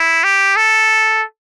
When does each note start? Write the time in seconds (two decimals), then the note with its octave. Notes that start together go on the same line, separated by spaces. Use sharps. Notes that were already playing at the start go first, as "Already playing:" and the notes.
Already playing: E4
0.24 G4
0.57 A4